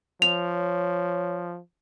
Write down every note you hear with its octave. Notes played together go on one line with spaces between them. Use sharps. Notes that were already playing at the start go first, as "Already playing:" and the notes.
F3 C#5 F7